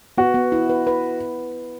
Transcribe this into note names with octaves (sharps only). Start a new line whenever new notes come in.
B3 F#4
B3
E4
B4
B4